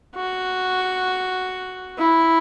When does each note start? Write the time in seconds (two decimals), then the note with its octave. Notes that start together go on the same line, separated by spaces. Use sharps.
0.15 F#4
1.98 E4